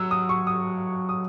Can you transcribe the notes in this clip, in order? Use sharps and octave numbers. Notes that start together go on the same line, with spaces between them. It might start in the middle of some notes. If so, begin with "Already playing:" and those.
Already playing: F#3 E6
D#6
C#6
D#6
D#6